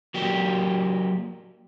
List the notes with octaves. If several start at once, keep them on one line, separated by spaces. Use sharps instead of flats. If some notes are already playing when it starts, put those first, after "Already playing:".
F#3 A#3 G4